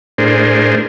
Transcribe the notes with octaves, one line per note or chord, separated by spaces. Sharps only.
A2 D4 G#4 A#4 C5